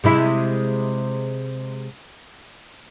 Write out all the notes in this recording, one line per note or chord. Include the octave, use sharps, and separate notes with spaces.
C3 G#3 E4